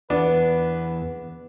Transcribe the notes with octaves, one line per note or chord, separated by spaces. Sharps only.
E2 B3 D4 B4